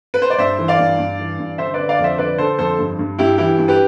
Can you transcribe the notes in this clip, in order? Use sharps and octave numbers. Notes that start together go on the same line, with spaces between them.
B4
C5
D5
G2 C5 E5
E3
D5 F5
G2
G2
E3
G2
D3 C5 E5
B4 D5
D3
D5 F5
F2
C5 E5
D3 B4 D5
D3 A4 C5
F2 A4 C5
G2
G2
G2 E4 G4
E3 E4 G4
G2
G4 B4